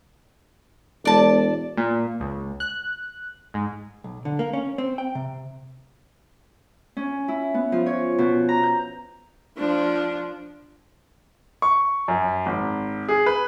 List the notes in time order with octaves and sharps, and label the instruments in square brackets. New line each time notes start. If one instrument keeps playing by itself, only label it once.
[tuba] E1 [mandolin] D5 A5
[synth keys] A#2
C#2
F#6
G#2
[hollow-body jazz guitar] B1
D3
A#3
C#4
C4
G5
C3
[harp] C#4
E4
B3
F3
C#5
B2
A#5
G6
[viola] F3 D4
[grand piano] C#6
F#2
G#1
G#4
B4